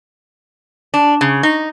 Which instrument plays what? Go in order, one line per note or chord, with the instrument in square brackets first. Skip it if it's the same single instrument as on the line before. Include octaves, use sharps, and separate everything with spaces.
[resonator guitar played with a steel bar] D4
C#3
D#4